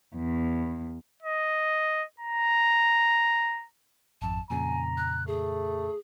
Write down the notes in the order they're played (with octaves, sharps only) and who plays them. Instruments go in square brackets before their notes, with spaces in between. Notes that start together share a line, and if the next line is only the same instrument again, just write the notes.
[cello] E2
[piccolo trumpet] D#5
A#5
[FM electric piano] G#1 F2 [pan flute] A5
[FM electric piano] F2 A#2 C#3 [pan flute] G#5 [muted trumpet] A#5
[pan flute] F#6
[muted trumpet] A3 [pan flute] G#4